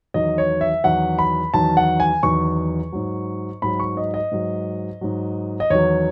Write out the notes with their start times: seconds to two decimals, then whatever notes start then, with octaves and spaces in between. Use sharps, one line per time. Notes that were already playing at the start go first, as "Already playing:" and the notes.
0.14 E2 D#3 F#3 D#5
0.38 C#5
0.61 E5
0.84 E2 D#3 F#3 F#5
1.19 B5
1.54 E2 D#3 F#3 A5
1.77 F#5
2.00 G#5
2.23 E2 D#3 F#3 C#6
2.93 G#2 F#3
3.62 G#2 F#3 B5
3.80 C#6
3.97 D#5
4.14 D#5
4.32 G#2 F#3
5.01 G#2 F#3
5.60 D#5
5.70 E2 D#3 F#3 C#5